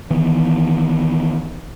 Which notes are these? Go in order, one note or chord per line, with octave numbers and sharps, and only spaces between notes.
D#3 E3 B3